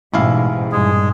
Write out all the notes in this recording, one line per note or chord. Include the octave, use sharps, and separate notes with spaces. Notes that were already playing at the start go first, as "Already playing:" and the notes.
A1 G#2 B2 E4 F5
G2 A#2 G#3 G#4